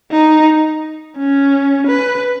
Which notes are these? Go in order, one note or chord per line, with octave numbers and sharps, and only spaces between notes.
D#4
C#4
B4